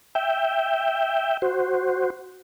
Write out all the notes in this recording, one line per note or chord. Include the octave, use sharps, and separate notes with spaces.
E5 G5
F#4 C5